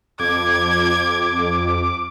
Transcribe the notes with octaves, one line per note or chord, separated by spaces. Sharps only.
F2 D6 G#6